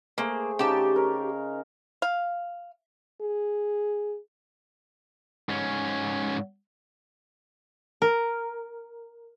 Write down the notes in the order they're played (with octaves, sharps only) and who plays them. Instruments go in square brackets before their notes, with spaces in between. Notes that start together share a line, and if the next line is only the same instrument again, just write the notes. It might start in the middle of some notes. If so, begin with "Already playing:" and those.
[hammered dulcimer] A3 G#4 C5 [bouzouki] A#3
[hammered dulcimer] C#3 D#4 [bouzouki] G4 A5
[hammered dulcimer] A#4 C#5
[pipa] F5
[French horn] G#4
[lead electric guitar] G#2 C#4
[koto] A#4